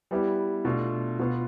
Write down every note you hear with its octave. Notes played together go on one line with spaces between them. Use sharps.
G3 B3 E4 G4
B2 A3 D4 F4
B2 B3 F4